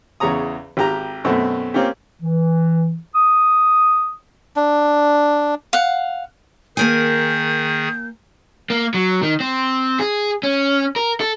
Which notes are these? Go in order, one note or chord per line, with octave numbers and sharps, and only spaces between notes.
E2 C#3 C#5 A#5 D#6
G#1 G4 A#5
F#2 B2 A3 C4
A#3 C4 C#4 F4 G4
E3
D#6
D4
F5 F#5
D#3 A#3 G#4 A#4 G#5 G6
A#3
F#3
D#3
C4
G#4
C#4
A#4
A4